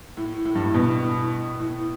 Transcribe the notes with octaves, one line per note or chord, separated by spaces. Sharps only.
A2
A2
G2
A2
B2
A2
A2